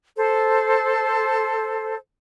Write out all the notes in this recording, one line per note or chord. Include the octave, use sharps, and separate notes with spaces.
A4 C5